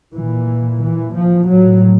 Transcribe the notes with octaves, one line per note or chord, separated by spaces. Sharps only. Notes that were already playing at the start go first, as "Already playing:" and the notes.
A#2 E3
E3
F3
A2 F#3